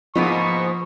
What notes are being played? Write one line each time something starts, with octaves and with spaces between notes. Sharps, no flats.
G#2 B2 F3 A#3 B3 D#4 C#6